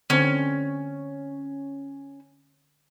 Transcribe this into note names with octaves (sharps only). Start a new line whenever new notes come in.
D3 C4 C#4